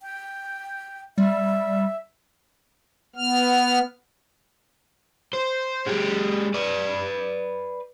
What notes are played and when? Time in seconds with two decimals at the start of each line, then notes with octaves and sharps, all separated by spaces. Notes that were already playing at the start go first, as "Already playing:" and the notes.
0.01 G5
1.18 G3 E5
3.16 B3 F6
5.33 C5
5.86 G#3 G4
6.54 B4 D5